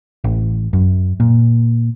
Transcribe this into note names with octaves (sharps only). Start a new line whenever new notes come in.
A1
F#2
A#2